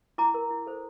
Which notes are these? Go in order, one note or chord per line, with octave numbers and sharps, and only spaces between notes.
E4 A#5 D6
A#4
E4
A4 C5